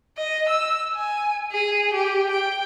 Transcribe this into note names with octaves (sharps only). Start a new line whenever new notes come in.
D#5
E6
G#5
G#4
G4
G5